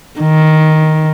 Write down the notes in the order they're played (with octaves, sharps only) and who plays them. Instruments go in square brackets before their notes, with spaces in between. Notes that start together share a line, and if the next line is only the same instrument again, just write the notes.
[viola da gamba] D#3